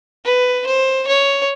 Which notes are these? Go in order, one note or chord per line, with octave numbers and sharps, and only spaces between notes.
B4
C5
C#5